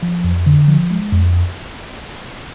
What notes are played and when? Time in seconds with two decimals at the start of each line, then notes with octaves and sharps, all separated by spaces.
0.02 F3
0.24 F2
0.46 D3
0.68 F3
0.91 G#3
1.12 F2